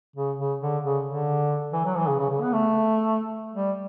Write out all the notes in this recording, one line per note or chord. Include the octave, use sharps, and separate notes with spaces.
C#3
C#3
D3
C#3
D3
E3
F#3
E3
C#3
C#3
C#3
B3
A3
G3